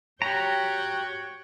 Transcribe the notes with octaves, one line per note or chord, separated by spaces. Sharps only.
F#4 G4 C#5 G5 A#5